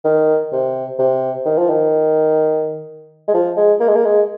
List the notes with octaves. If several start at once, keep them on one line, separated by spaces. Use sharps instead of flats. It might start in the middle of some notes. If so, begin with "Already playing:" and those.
D#3
C3
C3
D#3
F3
D#3
G#3
F3
G#3
A#3
G#3
A#3
G#3